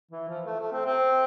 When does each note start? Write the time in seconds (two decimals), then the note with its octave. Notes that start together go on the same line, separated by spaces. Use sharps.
0.11 E3
0.28 F3
0.46 A3
0.60 A3
0.72 C4
0.86 C4